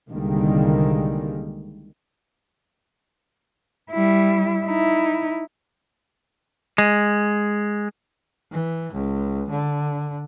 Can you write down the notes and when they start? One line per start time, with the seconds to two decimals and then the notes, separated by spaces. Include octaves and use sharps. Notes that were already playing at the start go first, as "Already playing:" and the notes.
0.11 C2 D3 D#3 G3 G#3 A#3
3.92 G3 E4
4.65 D#4 E4
6.78 G#3
8.51 E3
8.93 C#2
9.50 D3